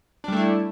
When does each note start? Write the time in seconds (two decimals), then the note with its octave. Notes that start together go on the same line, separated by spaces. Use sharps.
0.24 D4
0.28 G3
0.32 A3
0.36 E4